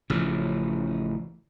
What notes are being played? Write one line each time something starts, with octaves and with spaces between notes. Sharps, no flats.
A1 C#3 F3